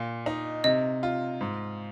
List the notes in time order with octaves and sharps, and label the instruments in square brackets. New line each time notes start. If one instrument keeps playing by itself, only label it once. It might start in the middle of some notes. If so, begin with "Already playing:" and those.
Already playing: [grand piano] A#2 [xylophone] F5
[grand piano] D#4
[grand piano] C3 [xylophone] D#5
[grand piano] F4
G#2